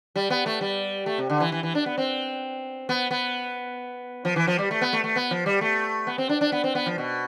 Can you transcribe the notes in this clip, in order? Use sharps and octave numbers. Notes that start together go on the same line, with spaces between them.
G3
B3
A3
G3
A3
C3
D3
E3
E3
E3
D4
B3
C4
B3
B3
F3
E3
F3
G3
A3
B3
A3
A3
B3
F3
G3
A3
B3
C4
D4
D4
B3
C4
B3
F3
B2